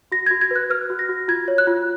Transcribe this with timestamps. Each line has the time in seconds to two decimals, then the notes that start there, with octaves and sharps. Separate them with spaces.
0.12 F#4 A#6
0.26 F#4 G#6
0.41 G#6
0.51 B4 F#6
0.70 B4 F6
0.90 F#4
0.99 A#6
1.09 F#4
1.28 F4 G#6
1.48 C#5
1.58 F#6
1.67 F4